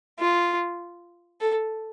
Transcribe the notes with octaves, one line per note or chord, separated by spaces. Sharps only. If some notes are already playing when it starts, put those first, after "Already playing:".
F4
A4